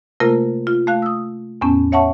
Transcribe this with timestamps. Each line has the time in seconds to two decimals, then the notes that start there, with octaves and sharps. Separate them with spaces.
0.20 C3 A3 A#3 F4 A#4
0.67 F4
0.87 A3 F5 F#6
1.02 D#6 E6
1.61 E2 A2 B3 C#4 A5
1.92 C#5 E5 F#5 A5 C#6